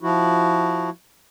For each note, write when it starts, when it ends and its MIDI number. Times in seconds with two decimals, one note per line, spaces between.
0.01 0.90 53
0.01 0.90 64
0.01 0.90 66